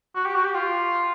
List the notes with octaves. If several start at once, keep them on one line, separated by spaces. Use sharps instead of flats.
F#4
G4
F#4
G4
F4